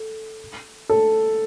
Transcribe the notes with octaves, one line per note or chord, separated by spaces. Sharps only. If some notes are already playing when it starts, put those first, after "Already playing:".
Already playing: A4
A4